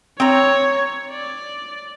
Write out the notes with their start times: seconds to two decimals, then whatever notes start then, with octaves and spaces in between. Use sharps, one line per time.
0.20 C4 C#5 A#5
1.11 D5